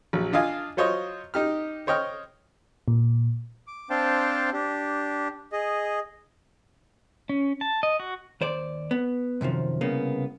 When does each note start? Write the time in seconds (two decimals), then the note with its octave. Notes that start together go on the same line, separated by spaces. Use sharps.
0.13 A#1 F#3
0.33 D4 F4 D#5 F5 G#5
0.77 F#3 F4 C5 C#5 D#5
1.34 D#4 G4 F6
1.87 C5 C#5 D#5 G5 F6
2.88 A#2
3.67 D6
3.90 C4 D4 C5 F5 G5 A5
4.53 D4 G4
5.52 G#4 D#5
7.29 C#4
7.61 A5
7.83 D#5
8.00 F#4
8.41 D#2 C5 D5
8.91 B3
9.41 F#2 C3 D#3 F3
9.81 C2 C#3 A#3 B3